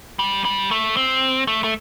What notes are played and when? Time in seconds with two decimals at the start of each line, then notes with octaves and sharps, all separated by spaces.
0.19 G3
0.45 G3
0.71 A3
0.97 C4
1.47 A3
1.64 A3